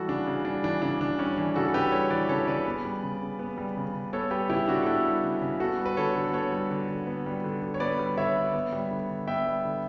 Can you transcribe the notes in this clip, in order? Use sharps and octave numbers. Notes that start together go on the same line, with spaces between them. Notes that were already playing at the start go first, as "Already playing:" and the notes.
Already playing: E3 G3 F#4 A4
C#3 D4
C#3
G3 D4
E3 D4
C#3 D4
C#3 D4
G3 C#4
E3 D4
C#3 F#4 A4
A4
C#3 G4 B4
G3 A4 C#5
E3 B4 D5
B4
C#3 A4 C#5
C#3 B4 D5
B3
G3
C#3
C#3
B3
G3
C#3
C#3
B3 A4 C#5
G3 G4 B4
C#3 E4 G4
C#3 D4 F#4
A4
B3 E4 G4
G3
C#3
C#3
B3 F#4 A4
G3
B4
D3 A4 C#5
D3
B3 A4 C#5
G3
D3
D3
B3
G3
D3
D3
C#5
B3 B4 D5
G3
D3 C#5 E5
D3
B3
G3
D3
D3
B3 E5 G5
G3
D3